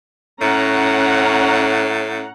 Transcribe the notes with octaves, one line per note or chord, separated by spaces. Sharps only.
A2 C#4 F#5 A#5